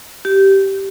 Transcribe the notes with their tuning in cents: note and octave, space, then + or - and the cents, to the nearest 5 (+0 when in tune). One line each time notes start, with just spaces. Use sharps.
G4 -15